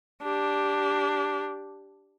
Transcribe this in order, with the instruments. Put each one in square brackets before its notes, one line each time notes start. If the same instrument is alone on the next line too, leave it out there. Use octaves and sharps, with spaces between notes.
[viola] D4 G4